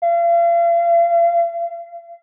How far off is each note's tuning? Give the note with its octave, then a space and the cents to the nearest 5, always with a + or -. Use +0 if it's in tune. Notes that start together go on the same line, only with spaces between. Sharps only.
F5 -40